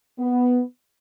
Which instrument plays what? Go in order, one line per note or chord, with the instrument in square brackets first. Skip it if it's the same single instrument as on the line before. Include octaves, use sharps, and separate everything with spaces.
[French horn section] B3